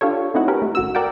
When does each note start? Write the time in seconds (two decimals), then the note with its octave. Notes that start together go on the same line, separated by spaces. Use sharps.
0.01 D4 F4 G4 A4 C#5
0.34 A3 C4 C#4 D#4 E4 F#4
0.48 B3 C#4 G4 A#4 B4
0.62 A3
0.75 G#1 F#4 E6
0.95 A#4 D5 F#5 G5